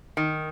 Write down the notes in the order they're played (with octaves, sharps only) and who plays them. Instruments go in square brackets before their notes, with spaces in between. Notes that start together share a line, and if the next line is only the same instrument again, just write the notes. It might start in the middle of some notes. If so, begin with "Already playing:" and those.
[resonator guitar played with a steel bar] D#3